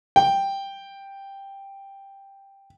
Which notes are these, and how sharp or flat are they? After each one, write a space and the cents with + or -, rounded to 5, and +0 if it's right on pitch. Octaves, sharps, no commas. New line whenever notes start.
G5 +5